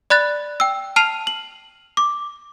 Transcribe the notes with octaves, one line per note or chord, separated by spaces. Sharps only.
D5 B5 F#6 A6
G5 E6
A5 F6 C7 D#7 F7
F#7
D6